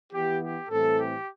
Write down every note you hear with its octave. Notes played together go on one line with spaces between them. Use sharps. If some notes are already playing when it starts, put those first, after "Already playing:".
E3 B3 E4 G4
G4
A2 E3 G3 C4 A4
G4